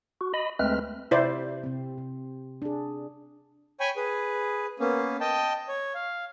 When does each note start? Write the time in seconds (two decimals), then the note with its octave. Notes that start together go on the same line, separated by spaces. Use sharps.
0.21 F#4
0.34 D#5 B5
0.59 D2 G#3 A3 C4 B4 F6
1.11 C3 E4 C5 D5
1.64 C3 C4
1.98 C3
2.62 D4 G#4
3.80 C#5 G5 G#5 B5 C#6
3.97 G#4 B4
4.80 A#3 B3 C#4
5.20 D#5 G5 A5
5.68 C#5
5.95 F5